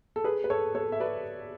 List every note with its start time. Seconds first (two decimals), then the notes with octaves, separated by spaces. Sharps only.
0.16 A4
0.24 G#4 B4
0.44 B4
0.50 A4 C#5
0.75 A4 C#5
0.92 E5
1.00 B4 D5